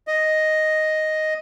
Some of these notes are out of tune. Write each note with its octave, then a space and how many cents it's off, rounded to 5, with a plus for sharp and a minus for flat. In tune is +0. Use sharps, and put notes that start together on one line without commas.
D#5 +0